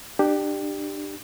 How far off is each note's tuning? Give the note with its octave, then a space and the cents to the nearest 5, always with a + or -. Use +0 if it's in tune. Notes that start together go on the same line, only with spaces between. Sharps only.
D4 +30 G4 +0